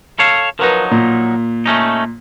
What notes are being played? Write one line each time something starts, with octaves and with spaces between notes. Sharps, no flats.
A4 C#5 F5
F3 F#3 D#4 A#4 B4
A#2
A3 C#4 D#4